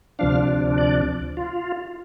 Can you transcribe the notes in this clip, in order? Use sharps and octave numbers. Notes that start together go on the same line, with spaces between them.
D2 C3 F3 D4 F5
D5
F4